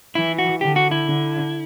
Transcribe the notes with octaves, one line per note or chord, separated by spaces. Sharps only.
E3 E4
F#4
D3 G4
F#4
E4
D3